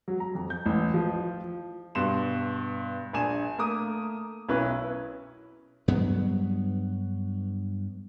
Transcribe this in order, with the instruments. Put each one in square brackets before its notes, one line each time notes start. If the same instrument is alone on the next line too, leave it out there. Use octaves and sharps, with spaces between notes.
[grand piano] F#3
A#5
F2
G6
A1
F3
G2 B2 C6 E7
A#1 D4 G#5 E7
A3 A#3 D6 D#6 D#7
B1 C#4 E4 B4
[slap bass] G2 F#3 B3